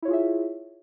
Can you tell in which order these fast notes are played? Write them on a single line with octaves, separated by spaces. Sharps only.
E4 C#5 F4 G#4 E5